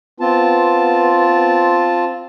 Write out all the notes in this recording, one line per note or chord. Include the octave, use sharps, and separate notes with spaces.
B3 C4 F4 A5